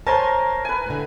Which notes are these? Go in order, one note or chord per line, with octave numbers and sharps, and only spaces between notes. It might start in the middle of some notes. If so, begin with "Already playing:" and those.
A#4 C5 C#5 G#5 A5 C6
B4 G#5
A2 D3